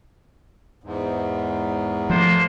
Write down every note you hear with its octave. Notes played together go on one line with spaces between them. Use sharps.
E2 G#2
F3 A3 A#3 D4 C5